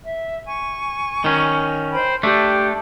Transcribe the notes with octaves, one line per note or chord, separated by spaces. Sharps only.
E5
G#5 C#6
D#3 C#4
C5 G5 B5
A3 D4 G4 G5